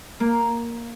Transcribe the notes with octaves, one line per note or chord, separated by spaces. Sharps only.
A#3